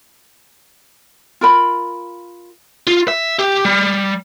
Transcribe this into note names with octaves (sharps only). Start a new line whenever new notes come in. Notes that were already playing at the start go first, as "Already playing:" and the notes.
F4 A#4 B5
F4
E5
G4
G3